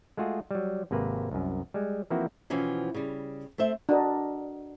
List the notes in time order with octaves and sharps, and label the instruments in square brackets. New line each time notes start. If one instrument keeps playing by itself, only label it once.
[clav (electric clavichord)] G#3 A3 F4 F#4 G#4
F#3 G3
G#1 C3 A#3 B4
C2 F#2
G3 G#3
E3 F3 A#3 C4 E4 F#4
[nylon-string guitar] B2 E3 F3 C4 C#4 F#4
C#3 G3
A3 C4 C5 E5
[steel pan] D4 F#4 A#4 D#5